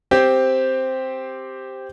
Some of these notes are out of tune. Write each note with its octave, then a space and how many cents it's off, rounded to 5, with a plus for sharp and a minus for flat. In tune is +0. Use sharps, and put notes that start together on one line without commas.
C4 +0 G4 +0 C5 +0